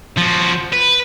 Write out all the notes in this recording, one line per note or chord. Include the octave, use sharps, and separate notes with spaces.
F3 F#4
B4